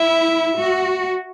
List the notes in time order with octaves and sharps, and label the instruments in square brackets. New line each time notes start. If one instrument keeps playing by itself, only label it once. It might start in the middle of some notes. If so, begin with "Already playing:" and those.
Already playing: [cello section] E4 [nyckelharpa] E5
[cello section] F#4